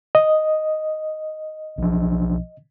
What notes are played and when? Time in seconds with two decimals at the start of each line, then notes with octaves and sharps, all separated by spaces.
0.15 D#5
1.78 B1 F3